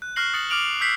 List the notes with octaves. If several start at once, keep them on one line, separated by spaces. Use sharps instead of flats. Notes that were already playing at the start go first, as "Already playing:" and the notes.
F#6
C#6 F6 F#6 A#6 C7 F#7
D#6 A6 C#7 F#7
D6 F6 D7 F7 F#7
D#6 E6 G6 B6 C7 F#7